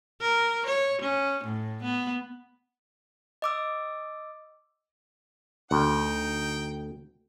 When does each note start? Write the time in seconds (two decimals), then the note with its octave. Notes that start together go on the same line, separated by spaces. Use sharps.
0.21 A#4
0.66 C#5
1.02 C#4
1.44 A2
1.83 B3
3.42 D#5 D6 E6
5.71 D2 D#4 G5